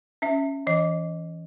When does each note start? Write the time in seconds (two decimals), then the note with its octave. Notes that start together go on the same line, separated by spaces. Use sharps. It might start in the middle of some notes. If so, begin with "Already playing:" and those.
0.22 C#4 E5
0.67 E3 D#5